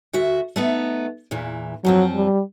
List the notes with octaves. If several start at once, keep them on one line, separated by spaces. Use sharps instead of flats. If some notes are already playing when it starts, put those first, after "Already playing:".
D2 F#4 E5
A3 B3 D#4
E2 A#2 E3
F#2 F3 F#3 C4
G3